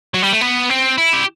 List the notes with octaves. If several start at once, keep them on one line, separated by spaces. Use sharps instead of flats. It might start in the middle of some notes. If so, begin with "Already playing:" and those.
F#3
G3
A3
B3
C4
E4
G4